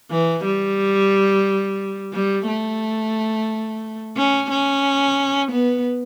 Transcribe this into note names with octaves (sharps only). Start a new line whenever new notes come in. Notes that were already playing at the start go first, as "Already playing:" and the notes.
E3
G3
G3
A3
C#4
C#4
B3